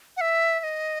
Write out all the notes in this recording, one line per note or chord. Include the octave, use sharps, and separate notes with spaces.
F#5
E5
E5
D#5